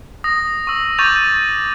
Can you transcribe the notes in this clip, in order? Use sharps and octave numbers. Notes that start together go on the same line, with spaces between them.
D#6 A#6
C#6 E6
C#6 D6 G6 A6 D#7 F7